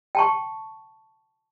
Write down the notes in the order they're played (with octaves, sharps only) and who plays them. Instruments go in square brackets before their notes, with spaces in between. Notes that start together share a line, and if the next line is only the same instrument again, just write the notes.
[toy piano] G5 A5 C#6